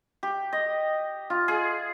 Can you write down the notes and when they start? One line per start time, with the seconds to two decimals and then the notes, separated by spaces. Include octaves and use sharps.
0.23 G4
0.53 D#5
1.30 F4
1.48 G#4